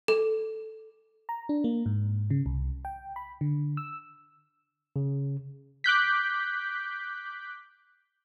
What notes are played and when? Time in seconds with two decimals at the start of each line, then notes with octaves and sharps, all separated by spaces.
0.08 A4
1.29 A#5
1.49 D4
1.64 A#3
1.86 G#2
2.30 C#3
2.46 C2
2.85 G5
3.16 B5
3.41 D3
3.77 E6
4.96 C#3
5.84 D6 F#6 G6 B6